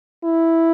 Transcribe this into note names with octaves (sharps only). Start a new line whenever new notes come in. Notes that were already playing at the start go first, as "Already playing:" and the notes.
E4